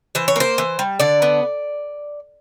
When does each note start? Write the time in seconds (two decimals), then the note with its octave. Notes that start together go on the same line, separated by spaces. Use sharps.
0.15 E3 C5
0.28 C#5
0.36 A#3 C5
0.58 E3
0.79 G3
1.00 D3 D5
1.22 B3